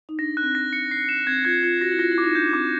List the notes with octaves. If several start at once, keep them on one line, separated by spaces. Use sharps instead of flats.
D#4
D4 A#6
F#6
C4
A#6
C#7
C7
E7
C4 G#6
F4 G#6
F4 C#7
F#4 A#6
E4
F4 A#6
E4
D6
D#4
D4 G6
C4 D6